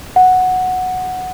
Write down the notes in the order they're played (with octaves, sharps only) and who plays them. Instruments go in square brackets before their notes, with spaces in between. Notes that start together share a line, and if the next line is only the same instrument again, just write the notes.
[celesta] F#5